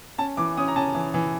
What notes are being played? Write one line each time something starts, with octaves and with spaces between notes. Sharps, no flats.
C#4 A5
E3 D6
C#4 D#6
A#5
C#4 A5
E3
E3